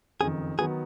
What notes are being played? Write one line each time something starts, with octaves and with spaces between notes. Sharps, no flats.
F#1 F2 D#3 G#4
D#3 F#3 B3 G#4